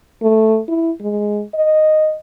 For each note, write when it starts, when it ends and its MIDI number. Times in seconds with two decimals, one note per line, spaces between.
0.23 0.60 57
0.69 0.91 64
1.01 1.42 56
1.55 2.15 75